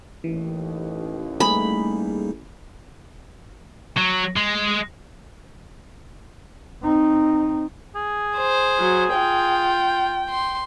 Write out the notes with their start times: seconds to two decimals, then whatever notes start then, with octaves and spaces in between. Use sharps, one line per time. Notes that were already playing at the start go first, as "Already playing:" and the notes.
0.24 A1 D#2 E3
1.40 G3 A3 A#3 D#4 G#4 B5
3.97 F#3
4.36 G#3
6.83 C4 D#4
7.95 G#4
8.37 C5
8.78 F#3
9.14 F4 G5
10.29 C6